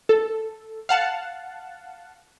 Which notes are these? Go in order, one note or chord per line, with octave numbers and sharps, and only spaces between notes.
A4
F5 F#5 A5